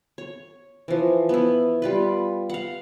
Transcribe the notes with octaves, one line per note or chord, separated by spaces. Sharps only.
C#5
E3 F3
B3 E4
G3 F4 B4
F5 F#5